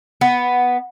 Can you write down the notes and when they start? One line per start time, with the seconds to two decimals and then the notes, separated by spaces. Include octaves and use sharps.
0.21 B3